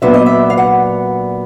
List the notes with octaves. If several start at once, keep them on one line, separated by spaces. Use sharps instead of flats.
A#2 F#3 B3 D4 E5
D#5
E5
F5
F#5